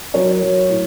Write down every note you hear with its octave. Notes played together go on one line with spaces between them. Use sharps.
F#3 A#4 C#5
F#3
A2